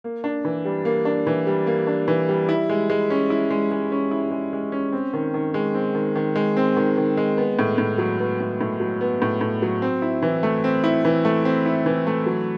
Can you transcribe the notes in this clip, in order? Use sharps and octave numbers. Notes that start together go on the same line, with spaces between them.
A#3
D4
E3
G3
A#3
D4
E3
G3
A#3
D4
E3
G3
E4
G#3
G#3
C#4
E4
G#3
G#3
C#4
E4
G#3
G#3
C#4
C4
D#3
D#3
G#3
C4
D#3
D#3
G#3
C4
D#3
D#3
G#3
B3
A2
A2
F#3
B3
A2
A2
F#3
B3
A2
A2
F#3
C4
E4
E3
A3
C4
E4
E3
A3
C4
E4
E3
A3
F#3